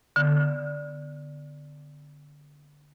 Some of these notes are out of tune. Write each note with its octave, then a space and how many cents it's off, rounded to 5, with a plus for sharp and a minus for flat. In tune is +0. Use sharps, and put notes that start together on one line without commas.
D3 +0 B3 +0